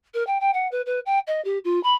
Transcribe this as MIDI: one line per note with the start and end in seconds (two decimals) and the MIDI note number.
0.14 0.25 70
0.26 0.38 79
0.40 0.50 79
0.53 0.67 78
0.71 0.81 71
0.85 0.99 71
1.05 1.19 79
1.27 1.42 75
1.44 1.58 67
1.64 1.81 65
1.83 1.94 83